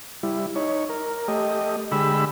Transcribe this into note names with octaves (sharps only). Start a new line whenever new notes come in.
G3 E4
D#4 C#5
A#4
A3 G4 D#5
D3 G#3 G4 B5 E6